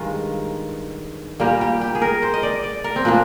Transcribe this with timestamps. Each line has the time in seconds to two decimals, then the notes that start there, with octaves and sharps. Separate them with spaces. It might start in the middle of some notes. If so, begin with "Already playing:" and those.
Already playing: G2 D#3 G#3 F4
1.40 A#2 G3 A#3 G4
1.61 G4
1.81 G4
1.95 G#4
2.02 A#4
2.23 C5
2.34 D#5
2.43 D5
2.64 D5
2.84 A#4
2.96 C4
3.05 A#2 F3 A#3 D4